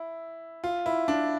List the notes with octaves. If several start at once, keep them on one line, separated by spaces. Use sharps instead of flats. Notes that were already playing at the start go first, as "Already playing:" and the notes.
Already playing: E4
F4
E4
D4